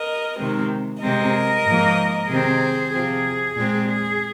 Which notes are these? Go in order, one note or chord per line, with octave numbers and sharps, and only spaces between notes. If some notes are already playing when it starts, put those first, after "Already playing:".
Already playing: A#4 D#5
C3 D#3 G#3 C4
C3 G#3 C4 A#4 D#5
G#2 F3 A#3
C3 D#3 C4 G#4 C5
C3 F3 C4 G#4
A#2 G#3 C4
G#4